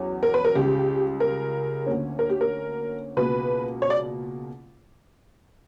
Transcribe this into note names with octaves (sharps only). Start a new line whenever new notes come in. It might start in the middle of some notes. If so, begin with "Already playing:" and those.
Already playing: E2 F#3 C#4
A#4
B4
A#4
C#2 C#3 G3 G4
A#4
D2 D3 A#3 C#4
A#4
G4
A#4
C#2 B2 A#3 B4
C#5
D5